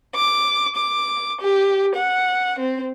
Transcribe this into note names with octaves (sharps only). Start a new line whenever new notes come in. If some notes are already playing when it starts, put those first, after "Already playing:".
D6
D6
G4
F#5
C4